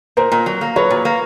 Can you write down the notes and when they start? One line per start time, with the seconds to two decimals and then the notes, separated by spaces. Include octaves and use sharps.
0.17 A#2 A#4 C5
0.32 A#2
0.46 F#3
0.61 A#3
0.76 F#3 B4 C#5
0.90 A#2
1.05 A#3